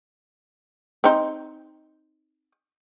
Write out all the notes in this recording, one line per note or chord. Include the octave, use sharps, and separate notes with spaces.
C4 D#4